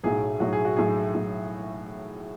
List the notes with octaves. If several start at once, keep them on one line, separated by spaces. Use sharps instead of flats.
B1 A2 F#3 G#4
B1 A2 F#3 F#4
G#4
F#4
B1 A2 F#3 G#4
A2 F#3